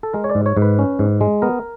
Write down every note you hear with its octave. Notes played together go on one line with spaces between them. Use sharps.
A4
G#3 A#4
C#5
D5
G#2
C#5
G#2
B4
C#4
G#2
G#3
B3 A#4